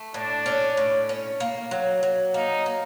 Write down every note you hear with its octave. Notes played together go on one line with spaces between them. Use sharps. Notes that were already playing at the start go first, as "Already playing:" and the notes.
Already playing: A3
A2 D4
C#4
A2
C#4
A#3
F#3
F#3
A#3 D#4
A#3